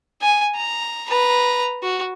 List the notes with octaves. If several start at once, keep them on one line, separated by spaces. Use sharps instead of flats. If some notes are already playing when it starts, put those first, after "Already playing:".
G#5
A#5
B4 A#5
F#4